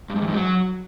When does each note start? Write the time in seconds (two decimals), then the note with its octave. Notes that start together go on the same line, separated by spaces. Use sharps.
0.10 G2
0.16 G#2
0.22 E2
0.28 G#2
0.33 F#3